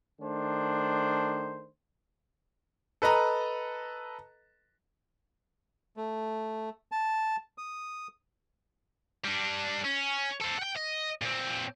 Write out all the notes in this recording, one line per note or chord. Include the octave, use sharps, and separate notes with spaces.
D#3 A3 D4 C5
A4 B4 D#5 A#5
A3
A5
D#6
G3 D4
C#4
A4 C5
F#5 G5
D#5
A#2 C4